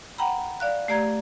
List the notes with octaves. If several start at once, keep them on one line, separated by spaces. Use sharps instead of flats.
F#5 G5 A#5 B5
D5 F5 F#6
A3 G4 D5 A#5 G#6